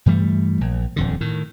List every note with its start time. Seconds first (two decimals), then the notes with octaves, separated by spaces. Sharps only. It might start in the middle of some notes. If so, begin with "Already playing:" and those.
0.06 G2 E3 G3 A3
0.61 A#1
0.96 D#1 F2 D3
1.21 A2 D#3